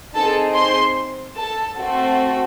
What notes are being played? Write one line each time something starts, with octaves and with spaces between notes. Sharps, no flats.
C4 D#4 G#4 A4 A5
C5 C6
A4 A5
A3 C4 F#4 A4